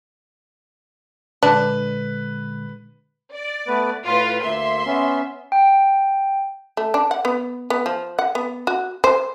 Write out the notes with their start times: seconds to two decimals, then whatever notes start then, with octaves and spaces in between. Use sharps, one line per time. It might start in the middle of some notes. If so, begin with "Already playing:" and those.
1.43 A#2 D3 G#3 D4 B4
3.34 D5
3.68 A3 B3 B4
4.05 A2 F4 B4
4.42 D2 A#3 E5 C6
4.86 B3 C#4
5.52 G5
6.77 A3
6.94 D4
7.11 F#5
7.25 B3
7.70 B3
7.86 F3
8.19 F#5
8.35 B3
8.67 F#4
9.04 C5